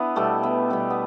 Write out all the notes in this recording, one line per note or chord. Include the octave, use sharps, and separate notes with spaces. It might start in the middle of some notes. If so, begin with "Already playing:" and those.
Already playing: B3 D4 E4
B2 G3 A3
B3
B2 G3 B3
B3